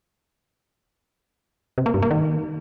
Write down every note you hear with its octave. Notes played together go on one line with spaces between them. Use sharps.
C3
A#3
G2
A#3
D#3